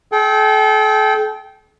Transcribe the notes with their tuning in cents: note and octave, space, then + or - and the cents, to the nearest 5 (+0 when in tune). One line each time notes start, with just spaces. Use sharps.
A4 -40 G5 -10